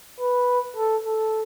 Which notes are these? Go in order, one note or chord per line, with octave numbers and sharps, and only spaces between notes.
B4
A4
A4